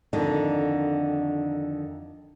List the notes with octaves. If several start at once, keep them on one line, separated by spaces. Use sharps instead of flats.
F2 D3 D#3 D4 D#4